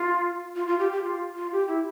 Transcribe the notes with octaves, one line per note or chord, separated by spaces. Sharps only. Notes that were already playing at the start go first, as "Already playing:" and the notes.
Already playing: F4
F4
F4
G4
G4
F4
F4
G4
E4